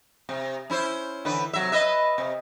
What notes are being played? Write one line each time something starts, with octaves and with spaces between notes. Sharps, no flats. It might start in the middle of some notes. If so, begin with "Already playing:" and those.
C3
C#4 E4 C5
D3 E3 B4
C3 F#3 E5
B4 D#5 E5
C3